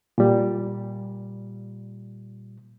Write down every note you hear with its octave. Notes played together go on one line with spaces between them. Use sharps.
A#2 G3